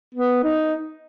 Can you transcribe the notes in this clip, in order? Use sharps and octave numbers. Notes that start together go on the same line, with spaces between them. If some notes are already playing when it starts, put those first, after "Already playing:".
B3
D#4